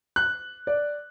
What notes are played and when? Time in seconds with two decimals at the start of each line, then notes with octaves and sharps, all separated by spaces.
0.16 F#6
0.67 D5